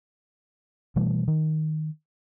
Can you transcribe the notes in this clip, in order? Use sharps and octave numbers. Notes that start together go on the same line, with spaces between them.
B2 E3 G3 A3
D#3